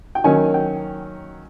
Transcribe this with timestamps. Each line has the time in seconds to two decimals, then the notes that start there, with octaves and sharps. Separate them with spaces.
0.15 G5
0.24 D#3 F#3 A#3 C#4 G#5
0.54 G5